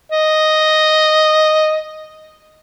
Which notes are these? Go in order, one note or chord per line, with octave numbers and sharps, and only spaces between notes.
D#5